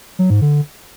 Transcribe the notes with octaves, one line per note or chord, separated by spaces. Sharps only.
F#3
G#2
D3